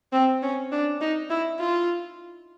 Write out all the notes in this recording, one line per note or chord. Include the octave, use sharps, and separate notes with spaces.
C4
C#4
D4
D#4
E4
F4